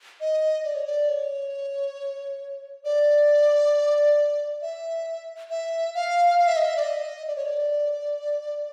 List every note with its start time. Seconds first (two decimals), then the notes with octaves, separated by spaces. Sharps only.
0.21 D#5
0.64 D5
0.75 C#5
0.85 D5
1.09 C#5
2.85 D5
4.62 E5
5.50 E5
5.95 F5
6.39 F5
6.47 E5
6.56 D#5
6.65 E5
6.77 D5
6.83 D#5
7.27 D5
7.36 C#5
7.45 D5